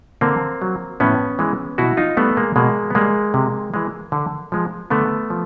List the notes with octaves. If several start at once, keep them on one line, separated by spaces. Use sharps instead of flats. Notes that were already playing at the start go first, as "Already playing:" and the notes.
D3 A#3 C4
F#3
A2 B3 C#4
E3 G#3
B2 E4 F#4
D#4 F4
G3 A3 B3
G#3 A#3
B2 G#3 A#3
B3
G3 G#3 A#3
C3
E3 G#3
D3
F3 G#3
D3 A3 B3
F3